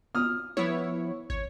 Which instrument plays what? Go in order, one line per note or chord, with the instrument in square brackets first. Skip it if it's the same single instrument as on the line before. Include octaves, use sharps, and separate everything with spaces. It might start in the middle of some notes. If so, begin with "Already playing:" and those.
[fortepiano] D#6 F6
[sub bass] F3 [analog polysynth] B3 E4 C#5
[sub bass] G#1 [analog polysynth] C#5